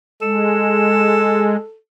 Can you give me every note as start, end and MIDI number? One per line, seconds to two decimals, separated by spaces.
0.22 1.56 56
0.22 1.77 69